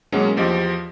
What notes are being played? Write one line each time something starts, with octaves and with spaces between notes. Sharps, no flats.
B2 F#3 G#3 A#3 C#4
E2 F3 G4 D#5